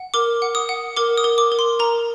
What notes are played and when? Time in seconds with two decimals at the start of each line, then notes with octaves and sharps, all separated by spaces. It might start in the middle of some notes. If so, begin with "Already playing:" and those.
Already playing: F#5
0.14 A#4 D6
0.42 F#5
0.55 D#6
0.69 F#5
0.97 A#4 D6
1.18 D#6
1.24 A#4
1.38 D6
1.52 A#4
1.59 C6
1.79 A#4 A#5